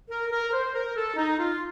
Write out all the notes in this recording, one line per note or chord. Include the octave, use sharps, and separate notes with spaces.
A#4
A#4
C5
A#4
A4
D#4
F4